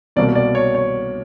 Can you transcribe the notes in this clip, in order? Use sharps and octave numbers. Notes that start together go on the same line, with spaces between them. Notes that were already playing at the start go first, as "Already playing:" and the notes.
C2 B2 F#3 A#3 D5
D5
C#5
C#5